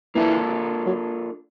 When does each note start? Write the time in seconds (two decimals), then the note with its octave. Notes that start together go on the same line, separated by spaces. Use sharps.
0.15 E3 A#3 D4 F4 A4
0.86 F#3